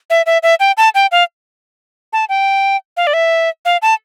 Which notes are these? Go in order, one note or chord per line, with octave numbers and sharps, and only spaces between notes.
E5
E5
E5
G5
A5
G5
F5
A5
G5
F5
D5
E5
F5
A5